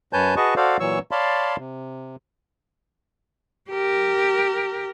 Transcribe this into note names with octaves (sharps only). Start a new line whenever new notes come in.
F#2 B4 C#5 G#5 A5 G6
F#4 G#4 B4 D#5 A5 C#6
F#4 A4 C5 D5 F5
A#2 E3 F#3 C#5 C#6 E6
C#5 D5 F5 A5 B5 C6
C3
G4 A#4